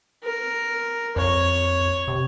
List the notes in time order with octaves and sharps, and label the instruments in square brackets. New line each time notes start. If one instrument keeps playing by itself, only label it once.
[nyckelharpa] A#4
[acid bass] F2 [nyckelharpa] C#5
[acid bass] C3